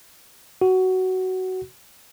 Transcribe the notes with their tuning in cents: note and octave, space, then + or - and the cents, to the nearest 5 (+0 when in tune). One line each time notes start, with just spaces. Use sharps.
F#4 +15